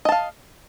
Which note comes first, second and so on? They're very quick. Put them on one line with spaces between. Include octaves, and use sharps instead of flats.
D#5 A5 F5